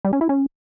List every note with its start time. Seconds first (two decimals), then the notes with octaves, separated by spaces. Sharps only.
0.05 G3
0.13 C#4
0.21 E4
0.29 C#4